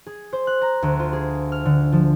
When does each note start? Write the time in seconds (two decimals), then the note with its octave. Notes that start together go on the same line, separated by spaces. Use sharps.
0.06 G#4
0.33 C5
0.47 F#6
0.62 A#5
0.83 D2
0.99 F4
1.13 G#4
1.52 F6
1.65 D3
1.92 F3